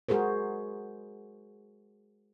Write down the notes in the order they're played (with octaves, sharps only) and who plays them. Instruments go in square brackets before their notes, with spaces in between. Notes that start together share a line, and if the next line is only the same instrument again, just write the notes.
[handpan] G#3 F#4 G#4 A#4 C5